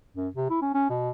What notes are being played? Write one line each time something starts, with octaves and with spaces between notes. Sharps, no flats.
F#2
C3
E4
C#4
C#4
B2